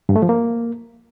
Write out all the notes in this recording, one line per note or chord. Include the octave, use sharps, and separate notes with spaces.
G2
A3
F3
A#3